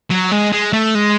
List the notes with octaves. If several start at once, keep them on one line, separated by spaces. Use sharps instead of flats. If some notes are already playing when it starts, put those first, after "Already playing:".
F#3
G#3
G#3
A3
G#3